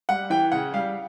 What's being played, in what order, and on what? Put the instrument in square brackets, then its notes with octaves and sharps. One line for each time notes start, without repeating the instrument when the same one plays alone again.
[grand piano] G3 F#5
E3 G5
C#3 F#5
G3 F5